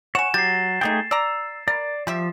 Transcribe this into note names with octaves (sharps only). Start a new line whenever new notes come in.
C#5 F#5 G#5 E7
F#3 G4 A6 C7
F#3 A3 A#3 D#4 G#4 G5
D5 A#5 E6
A#4 D5
F3 G3 G4 E5